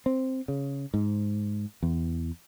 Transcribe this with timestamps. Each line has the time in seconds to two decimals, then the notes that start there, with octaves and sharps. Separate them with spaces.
0.06 C4
0.48 C#3
0.94 G#2
1.83 E2